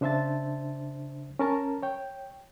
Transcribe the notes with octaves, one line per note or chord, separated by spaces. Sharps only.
C#3 D4 C5 E5 A5 A6
C#4 A#4 A5 A#5
C#5 G5